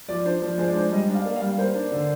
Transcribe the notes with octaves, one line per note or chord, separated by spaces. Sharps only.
F3 D5
D4 C5
F3
G#3 C5
D5
D4 C5
G3 D#5
D4
F5
A#3
F5
G3
A#3 C5
D4
D3